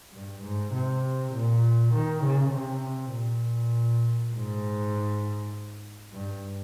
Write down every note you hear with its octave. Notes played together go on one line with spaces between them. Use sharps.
G2
G#2
C3
A#2
D#3
C#3
C3
A#2
G#2
G2